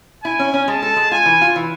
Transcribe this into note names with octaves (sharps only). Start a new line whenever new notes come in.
E4 G#5
C#4
C#4
G#3 A5
A4
G#3
F4 G#5
E3
F4
E3